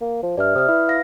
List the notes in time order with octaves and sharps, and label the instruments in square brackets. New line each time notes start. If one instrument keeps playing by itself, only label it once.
[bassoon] A#3
F3
[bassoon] G2 [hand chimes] D5 E5 F6
[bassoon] C3 [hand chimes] D#6 F6
[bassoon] E4 [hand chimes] B4
[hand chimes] F5 A#6